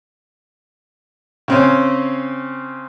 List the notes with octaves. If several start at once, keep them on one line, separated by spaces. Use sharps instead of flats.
C#3 C4 C#4